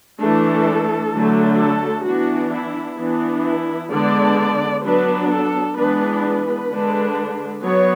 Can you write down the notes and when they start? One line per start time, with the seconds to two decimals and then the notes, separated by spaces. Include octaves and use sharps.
0.20 E3 A3 D4 A4
1.13 D3 F#3 A3 D4
1.60 A4
2.06 E3 B3 D4 F#4
2.53 E4
2.98 E3 B3 D4
3.45 E4
3.92 D3 G#3 B3 D4 D5
4.84 F#3 B3 D4 B4
5.31 A4
5.77 E3 G#3 B3 D4 B4
6.24 B4
6.70 D3 G#3 D4
7.63 F#3 B3 C#5